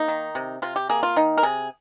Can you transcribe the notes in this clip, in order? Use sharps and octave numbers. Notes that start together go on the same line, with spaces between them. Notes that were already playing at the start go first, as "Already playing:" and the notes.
Already playing: A#3 D#4
D#3
C3
C3 F4
G4
A#3 G#4
F4
D#3 D#4
A#4
C3 G#4